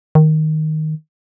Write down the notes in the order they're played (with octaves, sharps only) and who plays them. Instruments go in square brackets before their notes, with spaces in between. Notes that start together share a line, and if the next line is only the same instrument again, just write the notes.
[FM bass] D#3